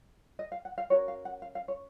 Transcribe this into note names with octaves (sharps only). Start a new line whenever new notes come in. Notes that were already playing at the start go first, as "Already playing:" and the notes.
D#5
F5
F#5
F5
C#4 F#4 A#4 C#5
F5
F#5
F5
F5
C#5